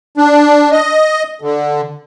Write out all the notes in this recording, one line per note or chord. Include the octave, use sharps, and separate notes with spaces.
D4
D#5
D3